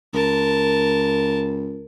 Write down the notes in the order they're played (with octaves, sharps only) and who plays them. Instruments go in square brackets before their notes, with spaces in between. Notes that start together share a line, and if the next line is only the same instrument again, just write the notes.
[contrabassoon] C#2 [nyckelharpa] A#4 A5